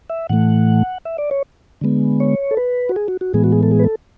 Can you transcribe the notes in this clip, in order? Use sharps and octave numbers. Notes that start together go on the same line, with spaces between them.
E5
A2 E3 A3 F#5
E5
D5
C#5
D3 G#3 B3
C#5
A4
B4
F#4
G#4
F#4
F#4
A2 E3 G#3 B3 G#4
F#4
G#4
A4
G#4
B4
A4